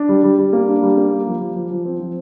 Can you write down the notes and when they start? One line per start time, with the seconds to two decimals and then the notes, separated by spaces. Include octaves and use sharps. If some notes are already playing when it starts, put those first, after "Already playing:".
Already playing: D4
0.09 G3
0.23 G3
0.38 G3
0.53 A#3
0.68 D4
0.83 G3
0.97 A#3
1.12 G4
1.27 F3
1.41 F3
1.56 F3
1.71 F3
1.85 C4
2.00 F3